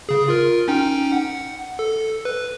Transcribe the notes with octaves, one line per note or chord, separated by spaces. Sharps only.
C#3 G#4
F4 A#4
C#4 D#4 G5
F#5
A4
B4